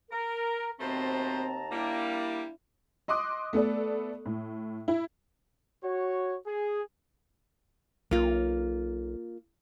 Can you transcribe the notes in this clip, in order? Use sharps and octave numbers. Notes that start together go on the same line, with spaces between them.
A#4
D#2 B2 A3 C4 C5 A5 A#5
G3 A#3 D4 E4
D#5 C6 D6 D#6 F#6
A3 B3 A4 D5
A2
E4
F#4 C#5
G#4
B1 A#3 F4